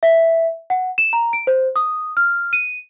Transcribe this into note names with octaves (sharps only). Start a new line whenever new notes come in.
E5
F#5
E7
A#5
D7
C5
D#6
F6
D#7